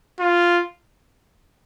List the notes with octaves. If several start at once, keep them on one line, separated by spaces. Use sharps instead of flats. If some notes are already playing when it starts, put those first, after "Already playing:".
F4